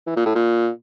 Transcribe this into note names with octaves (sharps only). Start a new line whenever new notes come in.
E3
A#2
A2
A#2